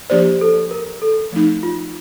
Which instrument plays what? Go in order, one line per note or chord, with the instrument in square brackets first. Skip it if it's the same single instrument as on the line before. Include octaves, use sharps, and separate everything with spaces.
[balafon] F3 A#3 D4 G4 D5 [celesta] C5
[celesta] A4
A#4
A4
[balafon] F3 A3 C4 D#4
[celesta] F4